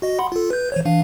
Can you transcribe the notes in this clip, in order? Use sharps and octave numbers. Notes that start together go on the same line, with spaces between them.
F#4 D#5
F#5 B5 C6
F4 A4
B4 G6
E3 C5 C#5
E3 D4 F5